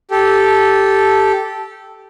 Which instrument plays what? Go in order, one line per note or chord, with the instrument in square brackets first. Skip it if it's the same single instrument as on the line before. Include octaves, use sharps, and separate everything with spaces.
[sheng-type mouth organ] G4 A4